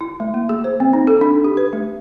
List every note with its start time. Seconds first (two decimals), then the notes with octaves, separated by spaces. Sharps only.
0.01 E4
0.20 A3
0.34 A#3
0.49 G#4
0.64 C5
0.80 C4
0.93 D#4
1.07 A4
1.21 D4
1.44 G4
1.57 B4
1.73 A3